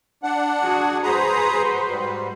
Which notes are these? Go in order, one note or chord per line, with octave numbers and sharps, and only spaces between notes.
D4 F#5
F#4 G#4
F#4 G#4 B4 C5 A#5 D#6
G#2 G3